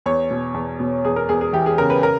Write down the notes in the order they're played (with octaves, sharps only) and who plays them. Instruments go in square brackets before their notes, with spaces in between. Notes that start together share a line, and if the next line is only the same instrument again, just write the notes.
[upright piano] E2 C#5
B2
E2
B2
E2 G#4
A#4
E2 G#4
G#4
E3 G4
G#4
C#3 A#4
B4
A#4